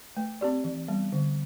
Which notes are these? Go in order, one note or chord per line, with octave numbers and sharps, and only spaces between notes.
A3
C4 G4 D5
E3
G3 B3
D3